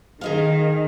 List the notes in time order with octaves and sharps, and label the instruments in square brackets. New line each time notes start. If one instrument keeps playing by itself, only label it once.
[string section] D#3 [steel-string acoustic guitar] G#4 D#5 F5